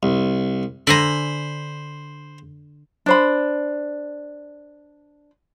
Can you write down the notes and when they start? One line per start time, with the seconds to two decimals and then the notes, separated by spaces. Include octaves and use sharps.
0.03 C2
0.87 D3 C5 G#5 A#5 B5
3.06 D4 C5 B5